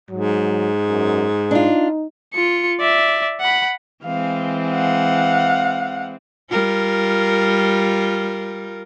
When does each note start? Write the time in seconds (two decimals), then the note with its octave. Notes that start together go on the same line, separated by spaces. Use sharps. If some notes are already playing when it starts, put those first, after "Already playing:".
0.11 G#2 F#3
0.88 F#2
1.51 D4 D#4 F4
2.34 F4 C#7
2.80 D5 E5
3.40 F#5 B5
4.04 E3 G#3 C4 F5
4.70 F5 F#5
6.51 G3 F4 A#4